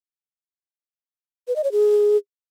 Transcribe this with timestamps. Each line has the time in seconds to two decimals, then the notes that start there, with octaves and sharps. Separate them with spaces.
1.48 B4
1.56 D#5
1.64 C#5
1.72 G#4